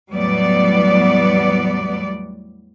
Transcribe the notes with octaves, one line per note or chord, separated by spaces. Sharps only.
E2 A2 F#3 G3 B3 D5